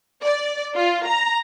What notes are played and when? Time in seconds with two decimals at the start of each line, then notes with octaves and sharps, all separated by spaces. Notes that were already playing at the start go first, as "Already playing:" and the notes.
0.23 D5
0.76 F4
1.06 A#5